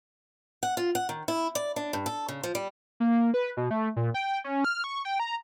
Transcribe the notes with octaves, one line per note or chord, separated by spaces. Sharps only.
F#5
F4
F#5
D#3
E4
D5
D4
G2
A4
C#3
F3
G3
A#3
B4
B2
A3
A#2
G5
C#4
F6
C#6
G5
A#5